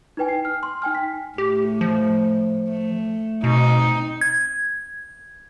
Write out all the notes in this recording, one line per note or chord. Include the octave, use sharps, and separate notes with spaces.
D#4 E4 B4 G5 G#5
C7
F6
C6
D#4 G5 G#5 F6
B6
A2 G4
F3
A3
B2 C4 D#4
G#6